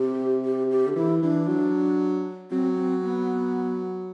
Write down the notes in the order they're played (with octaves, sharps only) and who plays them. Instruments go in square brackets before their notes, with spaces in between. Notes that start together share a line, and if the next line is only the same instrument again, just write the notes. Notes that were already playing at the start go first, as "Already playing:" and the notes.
Already playing: [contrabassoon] C3 [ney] G4
[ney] G4
G4
[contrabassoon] D3
[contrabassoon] E3 [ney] E4
[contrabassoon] E3 [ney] D4
[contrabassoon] F#3
[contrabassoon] F#3 [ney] C4
[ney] C4
B3